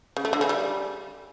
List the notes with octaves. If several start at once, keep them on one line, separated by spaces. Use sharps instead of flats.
C#3
A3
D3
C#3
G3